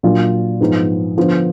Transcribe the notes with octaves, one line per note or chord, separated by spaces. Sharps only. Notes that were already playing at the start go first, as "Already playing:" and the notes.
A#2 F#3 D4 F4
G#2 F3 B3 D#4
D3 F3 B3